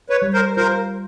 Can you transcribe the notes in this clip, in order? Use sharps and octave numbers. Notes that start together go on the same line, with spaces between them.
B4 C#5
G3
A#4 C5
F4 A#4 C5